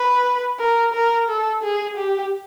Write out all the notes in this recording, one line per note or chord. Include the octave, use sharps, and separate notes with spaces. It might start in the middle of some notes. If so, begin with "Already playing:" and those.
Already playing: B4
A#4
A#4
A4
G#4
G4